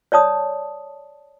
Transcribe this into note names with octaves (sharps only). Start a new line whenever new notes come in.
C#5 D5 A5 D#6